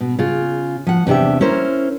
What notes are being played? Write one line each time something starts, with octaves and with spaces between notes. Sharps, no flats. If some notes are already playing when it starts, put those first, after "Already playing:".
B2
C#3 F4
F3 F#5
E2 C3 D4 G4 E5
C#4 E4 A#4 C5